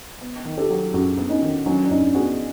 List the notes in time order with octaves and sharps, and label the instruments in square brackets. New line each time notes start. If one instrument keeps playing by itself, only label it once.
[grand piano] B3
D#3
[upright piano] G4 A4
[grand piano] F#3
[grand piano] F#2 [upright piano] F#4 G#4
[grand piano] B3
[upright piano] C#4 D#4
[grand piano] D#3
[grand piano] F#3 [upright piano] C#4
[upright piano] D4
[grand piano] F#2 [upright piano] C#4 D#4
[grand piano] B3 [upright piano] F#4 G#4